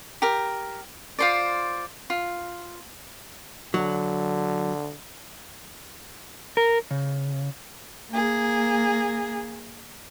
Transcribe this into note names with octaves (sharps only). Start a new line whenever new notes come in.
G4 A#4
F4 C5 D5
F4
D3 F#3
A#4
C#3
A#3 G#4